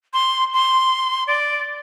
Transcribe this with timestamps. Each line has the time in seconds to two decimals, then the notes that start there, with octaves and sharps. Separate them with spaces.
0.13 C6
0.53 C6
1.27 D5